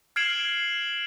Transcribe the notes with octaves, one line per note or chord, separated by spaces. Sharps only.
F6 G#6 C7 D7 E7 F#7